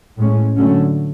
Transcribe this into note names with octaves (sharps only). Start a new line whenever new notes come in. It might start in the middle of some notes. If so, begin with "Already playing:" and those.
A2 G#3 C#4
D3 F#3 A3 C#4